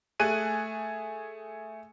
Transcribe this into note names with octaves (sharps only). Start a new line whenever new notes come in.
A3 G#4 G#5 F#6 D#7